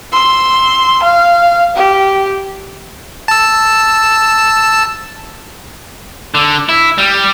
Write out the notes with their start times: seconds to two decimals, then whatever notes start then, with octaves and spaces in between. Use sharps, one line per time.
0.12 C6 E6
1.02 F5
1.76 G4
3.28 A5 E6
6.34 D3
6.69 E4
6.98 G3